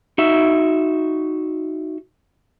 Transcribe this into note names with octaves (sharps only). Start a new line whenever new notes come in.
D#4 F#4 E5